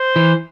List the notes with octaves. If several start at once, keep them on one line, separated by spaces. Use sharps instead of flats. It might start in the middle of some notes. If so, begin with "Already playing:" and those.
Already playing: C5
E3